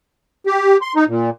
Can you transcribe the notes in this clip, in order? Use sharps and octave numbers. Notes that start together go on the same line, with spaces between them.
G4
C6
D#4
A#2